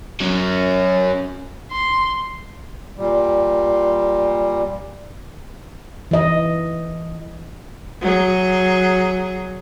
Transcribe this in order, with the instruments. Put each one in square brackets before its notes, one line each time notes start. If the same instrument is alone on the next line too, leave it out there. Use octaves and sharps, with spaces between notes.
[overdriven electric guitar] F#3 C#4
[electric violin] C6
[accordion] A#2 G3
[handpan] E3 D#5
[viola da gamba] F#3 G#4